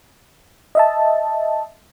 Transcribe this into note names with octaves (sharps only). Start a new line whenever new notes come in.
D#5 E5 A5